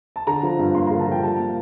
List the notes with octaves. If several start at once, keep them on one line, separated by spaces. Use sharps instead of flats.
A5
D3 A#5
F3
G2
A#3 C6
D3 A#5
A5
F3 G5
G3 A5
A#3